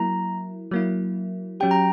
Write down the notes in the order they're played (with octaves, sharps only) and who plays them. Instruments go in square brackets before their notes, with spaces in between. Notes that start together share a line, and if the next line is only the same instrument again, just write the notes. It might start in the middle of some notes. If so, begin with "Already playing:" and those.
Already playing: [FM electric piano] F#3 A#3 E4 [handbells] A#5
[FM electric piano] F#3 A#3 E4
[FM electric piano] F#3 C#4 G4 [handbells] G5
[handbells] A#5